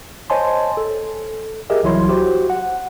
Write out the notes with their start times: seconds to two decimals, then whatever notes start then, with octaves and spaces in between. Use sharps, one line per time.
0.30 C5 C#5 D#5 G#5 A5 C6
0.77 A4
1.70 G4 G#4 A#4 D#5 E5
1.83 C2 E3 F#3 E4 C#5 C6
2.08 F#4 G4 C5
2.50 F#5